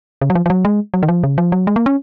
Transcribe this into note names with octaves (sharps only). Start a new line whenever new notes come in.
C#3
F#3
F3
F3
F#3
G#3
F#3
D#3
F3
C#3
F3
F#3
G#3
A#3
C#4